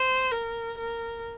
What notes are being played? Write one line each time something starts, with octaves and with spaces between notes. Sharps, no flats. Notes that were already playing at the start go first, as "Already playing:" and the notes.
Already playing: C5
A#4
A#4